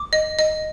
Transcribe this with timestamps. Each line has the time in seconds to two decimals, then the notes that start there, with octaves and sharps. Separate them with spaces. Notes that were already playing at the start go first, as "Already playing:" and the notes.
Already playing: D6
0.13 D#5
0.39 D#5